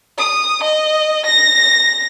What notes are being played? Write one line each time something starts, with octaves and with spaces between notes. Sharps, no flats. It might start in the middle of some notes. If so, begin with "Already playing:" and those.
D#6
D#5
A#6